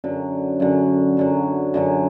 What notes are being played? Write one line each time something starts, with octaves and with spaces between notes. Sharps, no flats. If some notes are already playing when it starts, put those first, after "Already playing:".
F#2 D3 F#3
F#2 D3 F#3
F#2 D3 F#3
F#2 D3 F#3